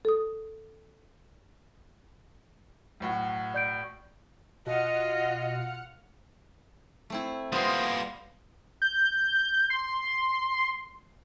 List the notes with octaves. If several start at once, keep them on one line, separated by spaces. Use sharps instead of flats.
A4 D#6
B1 A2 F#4
D5 G6 D7
B2 F4 D#5 F#5 F6 C#7
A3 C4 E4
G3 A#3 B3 F4 C5 C6 D#6
G6
C6